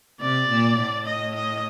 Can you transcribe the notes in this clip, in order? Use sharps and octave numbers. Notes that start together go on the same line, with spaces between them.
C3 D5
A#2
A2
D#5
D#5